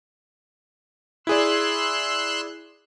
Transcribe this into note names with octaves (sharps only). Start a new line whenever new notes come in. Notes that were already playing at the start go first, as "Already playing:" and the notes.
E4 G#4 D5 C6 E6 F#6